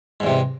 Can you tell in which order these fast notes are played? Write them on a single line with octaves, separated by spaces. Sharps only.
G#2 E2 C3